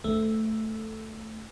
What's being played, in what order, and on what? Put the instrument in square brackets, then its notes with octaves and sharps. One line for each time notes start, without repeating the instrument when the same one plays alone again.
[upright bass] D2 [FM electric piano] A3